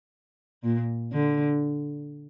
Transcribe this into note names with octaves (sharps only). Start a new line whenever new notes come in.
A#2
D3